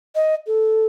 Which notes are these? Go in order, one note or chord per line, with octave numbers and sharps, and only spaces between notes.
D#5
A4